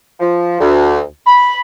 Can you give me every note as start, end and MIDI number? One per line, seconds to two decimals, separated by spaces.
0.19 0.59 53
0.60 1.00 38
1.26 1.60 83